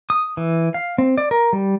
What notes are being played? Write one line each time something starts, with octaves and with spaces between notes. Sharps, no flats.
D#6
E3
F5
C4
D5
A#4
G3